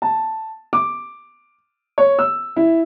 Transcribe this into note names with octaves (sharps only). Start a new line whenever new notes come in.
A5
D6
C#5
E6
E4